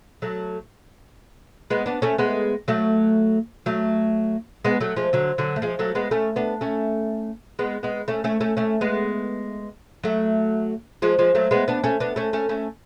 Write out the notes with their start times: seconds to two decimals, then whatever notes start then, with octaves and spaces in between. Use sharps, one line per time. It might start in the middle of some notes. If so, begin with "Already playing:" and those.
0.22 F#3 A3
1.70 G#3 B3
1.86 B3 D4
2.02 A3 C#4
2.18 G#3 B3
2.68 F#3 A3
3.66 F#3 A3
4.65 G#3 B3
4.81 F#3 A3
4.96 F3 G#3
5.13 D3 F#3
5.38 D3 F#3
5.56 A3
5.62 F3 G#3
5.79 F#3 A3
5.95 G#3 B3
6.11 A3 C#4
6.36 B3 D4
6.61 A3 C#4
7.59 G#3 B3
7.83 G#3 B3
8.08 A3 C#4
8.24 A3 C#4
8.41 A3 C#4
8.57 A3 C#4
8.81 G#3 B3
10.03 F#3 A3
11.02 F3 G#3
11.19 F3 G#3
11.35 F#3 A3
11.51 G#3 B3
11.68 B3 D4
11.84 A3 C#4
12.00 B3 D4
12.16 A3 C#4
12.33 A3 C#4
12.49 A3 C#4